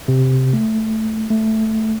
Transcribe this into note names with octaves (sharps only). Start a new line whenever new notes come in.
C3
A3
A3